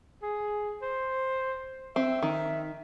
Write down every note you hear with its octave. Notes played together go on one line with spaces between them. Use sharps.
G#4
C5
C4 E5
D#3